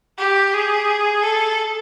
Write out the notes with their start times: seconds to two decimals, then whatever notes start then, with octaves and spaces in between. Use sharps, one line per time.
0.18 G4
0.53 G#4
1.22 A4